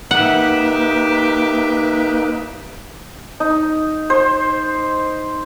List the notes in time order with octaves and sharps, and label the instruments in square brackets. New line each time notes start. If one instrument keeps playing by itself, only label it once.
[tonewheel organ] A#3 D#4 B4 [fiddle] G4 E5 [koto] F#5
[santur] D#4
C5